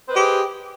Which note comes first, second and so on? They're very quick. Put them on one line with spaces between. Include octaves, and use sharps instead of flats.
C5 B4 D#5 G4 G#4